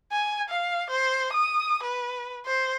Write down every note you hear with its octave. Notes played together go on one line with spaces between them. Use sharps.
G#5
F5
C5
D#6
B4
C5